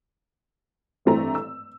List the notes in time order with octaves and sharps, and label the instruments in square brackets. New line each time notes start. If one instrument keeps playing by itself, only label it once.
[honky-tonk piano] G#1 G2 E3 A3 C4 A#5
E6